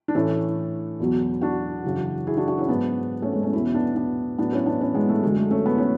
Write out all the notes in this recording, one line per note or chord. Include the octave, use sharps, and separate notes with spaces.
D4
A2 E3 A3 C#4
E2 B2 F#3
D4 F#4
F#2 C#3 E3
E4 G#4
D4 F#4
D4 F#4
C#4 E4
G#2 F#3 B3 D4
A3 C#4
G#3 B3
A3 C#4
E2 B2 F#3 C#4 E4
B3 D4
B3 D4
A2 F#3 B3 D4
C#4 E4
B3 D4
C#4 E4
G#3 B3
A3
F#2 D3 F#3 G#3
A3
A3 C#4
B3
C#4